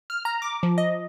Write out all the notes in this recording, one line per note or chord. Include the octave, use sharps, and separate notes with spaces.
F6
A#5
D6
F3
D#5